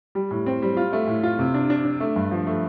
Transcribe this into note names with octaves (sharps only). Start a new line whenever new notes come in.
G3
A2
C4
G3
F4
A3
A2
F4
C3
D4
D4
D4
A3
G2
F3
A3